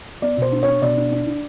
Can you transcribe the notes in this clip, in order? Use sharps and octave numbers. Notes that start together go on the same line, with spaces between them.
B3 D5
B2 C5
D4
D4 C#5
B2 D5
D4
D4
D4